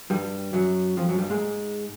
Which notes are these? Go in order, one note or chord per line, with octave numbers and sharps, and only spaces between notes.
G2 G3
F#2 F#3
F2 F3
F#2 F#3
G2 G3
G#2 G#3